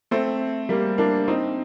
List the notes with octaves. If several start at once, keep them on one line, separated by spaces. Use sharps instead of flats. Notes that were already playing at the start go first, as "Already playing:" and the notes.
A3 C4
G3 A#3
A#3 D4
C4 D#4